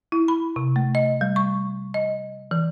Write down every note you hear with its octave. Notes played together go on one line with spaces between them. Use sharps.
E4
B5
C3
A3
D#5
G3
C#6
D#5
E3